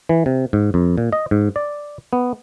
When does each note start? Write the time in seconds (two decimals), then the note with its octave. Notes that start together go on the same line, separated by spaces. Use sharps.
0.09 E3
0.26 C3
0.53 G#2
0.74 F2
0.98 A#2
1.13 D#5
1.31 G#2
1.56 D5
2.13 B3